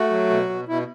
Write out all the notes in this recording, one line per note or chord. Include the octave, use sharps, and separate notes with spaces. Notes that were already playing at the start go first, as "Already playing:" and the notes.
Already playing: A3 F#4
F#3
B2
B2
B2 E4